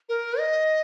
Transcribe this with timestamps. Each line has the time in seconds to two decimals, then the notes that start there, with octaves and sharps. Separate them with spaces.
0.09 A#4
0.39 D#5